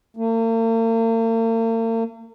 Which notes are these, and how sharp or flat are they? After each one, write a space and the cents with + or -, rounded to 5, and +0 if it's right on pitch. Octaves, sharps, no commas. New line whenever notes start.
A#3 -45